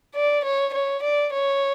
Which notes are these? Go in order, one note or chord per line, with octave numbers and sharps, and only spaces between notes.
D5
C#5
C#5
D5
C#5